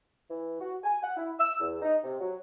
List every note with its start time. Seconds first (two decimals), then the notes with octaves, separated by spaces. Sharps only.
0.30 E3
0.60 F#4
0.84 G#5
1.03 F#5
1.17 E4
1.39 E6
1.60 E2
1.82 D#4
2.04 C3
2.21 F#3